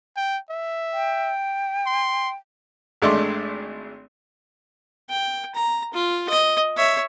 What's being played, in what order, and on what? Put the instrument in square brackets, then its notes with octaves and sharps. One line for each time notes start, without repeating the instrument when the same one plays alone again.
[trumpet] G5
E5
[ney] G5
[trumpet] C6
[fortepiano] G#1 G#3 A3 D4 E5 C6
[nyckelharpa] G5
A#5
F4
D#5
C#5 E5